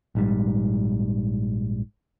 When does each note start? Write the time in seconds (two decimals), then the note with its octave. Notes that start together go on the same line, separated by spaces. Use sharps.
0.15 A#1 G#2 G3